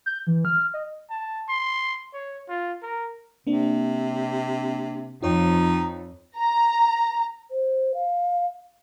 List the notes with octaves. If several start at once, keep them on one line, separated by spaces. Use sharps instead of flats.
G6
E3
F6
D#5
A5
C6
C#5
F4
A#4
C3 A#3 C4 D4
F2 D#4 F4 C#5 G5
A#5
C5
F5